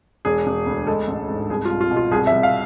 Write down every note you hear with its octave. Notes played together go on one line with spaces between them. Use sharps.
E1 G#4
E1
D2
G#3 A4
A1
G#2
C2 G#4
F4
C2
F4
B2
F4
C2 G#4
E5
C2
F5